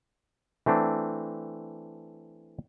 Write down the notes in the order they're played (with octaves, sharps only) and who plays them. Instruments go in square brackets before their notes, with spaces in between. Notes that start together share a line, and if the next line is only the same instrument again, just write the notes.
[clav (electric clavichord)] E3 A3 C4 D4